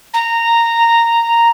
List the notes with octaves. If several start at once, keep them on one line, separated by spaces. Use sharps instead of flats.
A#5